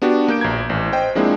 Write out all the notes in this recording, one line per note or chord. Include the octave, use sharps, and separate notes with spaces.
B3 D4 F#4 G4
A#3 G6 D7
A#1 A#5 G#6
A1
C5 D#5 G5
F3 G#3 A#3 C4 D4 E4